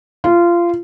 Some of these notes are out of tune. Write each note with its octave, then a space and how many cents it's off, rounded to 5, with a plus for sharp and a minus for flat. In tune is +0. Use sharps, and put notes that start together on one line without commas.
F4 -20